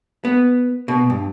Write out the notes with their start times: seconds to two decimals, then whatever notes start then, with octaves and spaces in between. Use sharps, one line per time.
0.25 B3
0.88 B2
1.10 G2